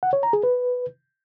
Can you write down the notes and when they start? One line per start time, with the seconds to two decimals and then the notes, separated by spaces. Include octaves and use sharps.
0.03 F#5
0.13 C#5
0.23 A#5
0.33 G#4
0.43 B4